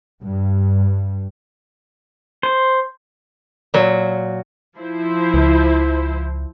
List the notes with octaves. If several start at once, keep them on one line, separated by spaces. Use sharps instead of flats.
G2
C5
A#2 F#3
F3 E4 C5
C#2